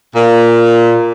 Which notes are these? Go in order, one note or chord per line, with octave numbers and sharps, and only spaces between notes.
A#2